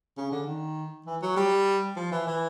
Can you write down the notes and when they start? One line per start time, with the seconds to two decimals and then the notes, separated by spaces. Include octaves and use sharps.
0.17 C#3
0.32 D3
0.46 D#3
1.06 E3
1.22 F#3
1.36 G3
1.96 F3
2.12 E3
2.27 E3